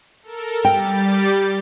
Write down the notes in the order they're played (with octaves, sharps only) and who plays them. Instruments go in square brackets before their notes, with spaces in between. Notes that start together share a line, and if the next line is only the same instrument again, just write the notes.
[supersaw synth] A4 A#4
[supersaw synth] G3 G4 A6 [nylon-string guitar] G5